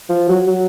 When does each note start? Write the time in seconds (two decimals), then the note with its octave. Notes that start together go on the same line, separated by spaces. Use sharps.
0.09 F3
0.29 F#3
0.48 F#3